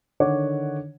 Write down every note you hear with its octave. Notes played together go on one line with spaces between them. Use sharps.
D3 D#3 C#5 F#5 D6